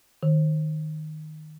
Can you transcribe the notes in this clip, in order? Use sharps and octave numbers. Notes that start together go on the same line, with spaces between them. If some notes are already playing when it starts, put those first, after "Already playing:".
D#3